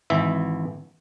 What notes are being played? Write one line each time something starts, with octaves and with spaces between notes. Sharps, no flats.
G#1 E3 E5